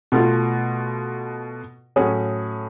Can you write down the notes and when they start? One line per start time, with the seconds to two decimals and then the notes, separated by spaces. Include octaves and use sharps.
0.12 B2 A3 F4
1.96 A2 F#3 C#4 G#4